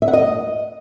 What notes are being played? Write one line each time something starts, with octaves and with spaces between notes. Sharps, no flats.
E5
F#5
D#5